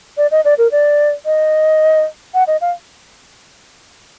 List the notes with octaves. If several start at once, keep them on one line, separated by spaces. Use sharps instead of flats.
D5
D#5
D5
A#4
D5
D#5
F#5
D#5
F5